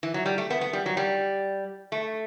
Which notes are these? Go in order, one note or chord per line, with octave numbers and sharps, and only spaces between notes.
E3
F#3
G3
A3
B3
B3
G3
F#3
G3
A3